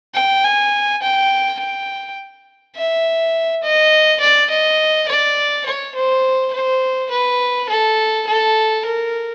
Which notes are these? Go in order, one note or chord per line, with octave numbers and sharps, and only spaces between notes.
G5
G#5
G5
G5
E5
D#5
D5
D#5
D5
C#5
C5
C5
B4
A4
A4
A#4